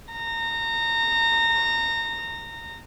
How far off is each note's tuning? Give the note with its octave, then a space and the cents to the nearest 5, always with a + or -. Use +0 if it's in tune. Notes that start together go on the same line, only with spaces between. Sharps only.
A#5 -25